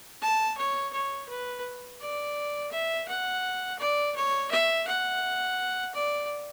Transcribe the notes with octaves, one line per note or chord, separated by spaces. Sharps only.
A5
C#5
C#5
B4
D5
E5
F#5
D5
C#5
E5
F#5
D5